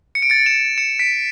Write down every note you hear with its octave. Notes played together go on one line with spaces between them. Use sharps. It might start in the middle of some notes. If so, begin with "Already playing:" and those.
C#7
D7
A6 C#7
C#7 E7
C#7 E7
B6 D7